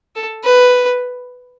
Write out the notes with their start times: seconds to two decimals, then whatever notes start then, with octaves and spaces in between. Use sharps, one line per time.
0.16 A4
0.44 B4